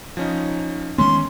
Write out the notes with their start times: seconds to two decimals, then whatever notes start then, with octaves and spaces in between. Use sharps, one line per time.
0.17 F3 C#4 D#4
0.98 D#3 G#3 B3 C#4 C6